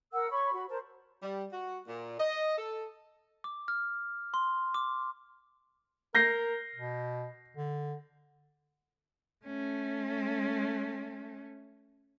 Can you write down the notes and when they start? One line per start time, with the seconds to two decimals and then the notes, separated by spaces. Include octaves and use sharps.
0.13 A#4 F#5 E6
0.31 C#5 B5 C#6
0.53 F#4 B5
0.69 A#4 C5 A5
1.23 G3
1.52 F#4
1.87 A#2
2.20 D#5
2.58 A4
3.44 D6
3.68 F6
4.34 C6
4.74 D6
6.15 A#4 G6 A#6 C7
6.75 B2
7.57 D3
9.46 A3 C#4